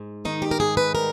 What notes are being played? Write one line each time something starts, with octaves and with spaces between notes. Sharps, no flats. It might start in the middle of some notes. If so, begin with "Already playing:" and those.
Already playing: G#2
D#3 D#4
G4
A#4
G#2 G#4
B4
G3 A#4